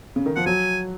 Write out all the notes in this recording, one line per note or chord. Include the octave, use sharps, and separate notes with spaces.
C#3
D#3
F3 F#5
F#3 G#5